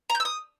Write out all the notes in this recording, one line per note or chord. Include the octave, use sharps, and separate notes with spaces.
A#5
G6
E6
D#6